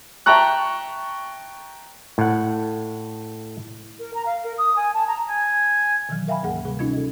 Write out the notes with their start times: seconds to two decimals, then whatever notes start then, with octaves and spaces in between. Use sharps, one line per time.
0.26 E5 G5 A5 A#5 C#6 F#6
2.18 A2 F#5
3.99 A#4
4.14 A#5
4.26 F5
4.44 A#4
4.58 D#6
4.76 G#5
4.94 A5
5.08 A#5
5.29 G#5
6.09 B2 D#3 E3 F#3 F6
6.28 A#4 E5 F5 G5 G#5 B5
6.43 D2 G#2 A#3 G#4 F#5
6.65 C3 G3 G#4
6.79 C#4 D#4 F4 D#5 G#6
6.93 A4 D#5